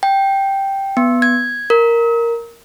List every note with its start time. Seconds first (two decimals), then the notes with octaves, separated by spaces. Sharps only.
0.03 G5
0.97 B3
1.22 G#6
1.70 A#4